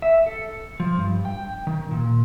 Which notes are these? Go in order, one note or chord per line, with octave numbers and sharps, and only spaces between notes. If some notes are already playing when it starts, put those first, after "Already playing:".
E5
A4
F3
G2
G5
D#3
A#2